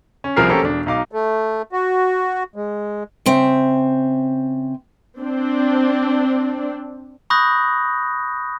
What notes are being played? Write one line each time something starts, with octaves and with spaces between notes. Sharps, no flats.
C#4
C2 F3 G#4 A#4 F6 C7
A#3 C#4 G4 A4 A#4 C5
E1 D4
B1 D#4 F5 D6
A3
F#4
G#3
C#3 C4 E5
C4 D4
B5 C#6 D#6 F#6 G6 A#6